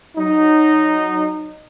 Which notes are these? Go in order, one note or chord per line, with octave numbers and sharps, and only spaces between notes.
F#3 D#4